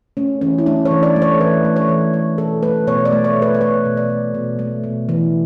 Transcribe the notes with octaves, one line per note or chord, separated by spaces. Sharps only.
A3 C#4
E3 C#4
E4
A3 D4
C#5
E3
D5
A3
C#5
E3 B4
A3
C#5
E3
A3 C#5
B2 A4
A3 B4
B2 C#5
D5
A3
C#5
B2
B4
B4
A3 C#5
B2
D5
A3
B2
A3
B2
E3